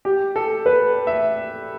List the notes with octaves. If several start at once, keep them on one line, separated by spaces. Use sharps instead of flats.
G4
A4
B4
E5